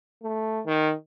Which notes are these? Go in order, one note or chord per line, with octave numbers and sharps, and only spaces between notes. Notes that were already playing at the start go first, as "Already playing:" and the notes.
A3
D#3